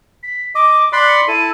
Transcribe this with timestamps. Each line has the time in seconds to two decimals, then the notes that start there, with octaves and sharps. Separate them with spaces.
0.23 B6
0.55 D#5 D6
0.93 D5 B5 C6 F#6
1.07 C#7
1.28 E4 A4 D#7